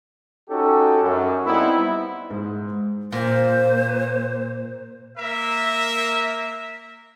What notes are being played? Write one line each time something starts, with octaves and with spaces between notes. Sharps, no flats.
C#4 D#4 F#4 G4 A4
F#2
G3 B3 C4 D#4 E4
G#2
A#2 C5
A#3 A#4 E5